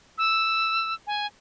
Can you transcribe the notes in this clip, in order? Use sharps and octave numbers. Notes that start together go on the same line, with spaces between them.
E6
G#5